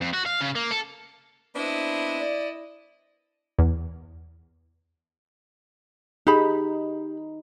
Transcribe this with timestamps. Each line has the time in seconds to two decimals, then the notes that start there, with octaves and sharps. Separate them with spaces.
0.01 F2
0.14 F#4
0.26 F5
0.41 C#3
0.55 A#3
0.71 A4
1.55 B3 C4 D4 E4 D#5
2.21 D5
3.58 E2
6.27 D#4 G4 G#4 B5